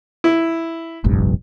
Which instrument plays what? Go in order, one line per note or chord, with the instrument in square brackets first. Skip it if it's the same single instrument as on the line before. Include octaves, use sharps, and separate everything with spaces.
[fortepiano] E4
[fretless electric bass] F1 A#1 G2